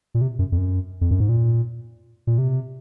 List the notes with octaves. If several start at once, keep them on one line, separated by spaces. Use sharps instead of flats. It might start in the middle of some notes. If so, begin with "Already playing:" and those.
A#2
C3
F#2
F2
F#2
F2
F#2
G#2
A#2
A#2
C3